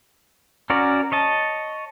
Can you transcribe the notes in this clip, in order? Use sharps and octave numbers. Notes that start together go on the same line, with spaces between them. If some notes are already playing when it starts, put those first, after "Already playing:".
C#4 F#4 A#4 D5
C#5 D#5 A5